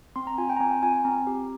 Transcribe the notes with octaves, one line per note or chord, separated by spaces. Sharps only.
C4 C6
A#5
F4 G#5
G5
A#5
C4 G#5
G5
F4 G#5
G#5
C4 A#5
G4